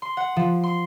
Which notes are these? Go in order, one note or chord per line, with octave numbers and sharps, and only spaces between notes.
C6
F#5
F3
C6